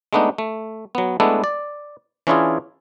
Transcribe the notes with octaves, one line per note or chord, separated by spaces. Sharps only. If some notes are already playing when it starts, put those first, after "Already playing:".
G#3 A3 B3 D4 D#4
A3
F#3 B3
G#3 A3 B3 D4 E4 A4
D5
E3 C#4 D4 E4 F4 G#4